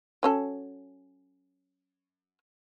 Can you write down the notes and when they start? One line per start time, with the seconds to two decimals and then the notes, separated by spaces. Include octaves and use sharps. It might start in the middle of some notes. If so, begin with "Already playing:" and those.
0.23 F#3 C#4 A4